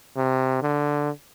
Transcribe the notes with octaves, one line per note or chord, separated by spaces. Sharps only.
C3
D3